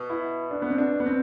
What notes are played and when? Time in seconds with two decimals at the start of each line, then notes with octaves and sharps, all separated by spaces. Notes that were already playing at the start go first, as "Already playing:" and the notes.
Already playing: B2
0.10 E4
0.51 D4
0.62 B3
0.70 C4
0.78 D4
1.00 B3
1.06 C4